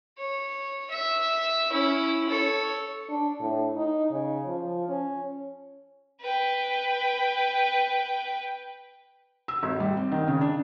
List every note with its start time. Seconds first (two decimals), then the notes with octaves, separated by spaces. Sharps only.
0.18 C#5
0.91 E5
1.71 C#4 E4
2.29 A4 C#5
3.09 D4
3.41 A2
3.76 D#4
4.11 C#3
4.47 F3
4.88 C#4
6.21 B4 G5
9.48 E6
9.63 G#1
9.80 G3
9.97 C4
10.12 D#3
10.28 C#3
10.41 D4